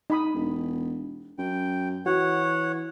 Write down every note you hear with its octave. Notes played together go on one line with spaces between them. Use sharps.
D#4 B5 D#6
E1
F#2 G5
E3 F#4 C#5 F#5